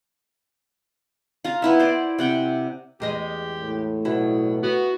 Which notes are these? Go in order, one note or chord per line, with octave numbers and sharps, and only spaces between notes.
F4 A#5
B3 E4 E5
C5 D5
C3 F#5 G5
E2 G#3 G4 D#5
A2
B2 F#3 E4
B3 F#4